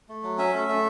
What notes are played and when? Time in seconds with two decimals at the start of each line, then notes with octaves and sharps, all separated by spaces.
0.09 A3
0.23 F#3
0.38 C#4 E5
0.54 A3
0.69 A3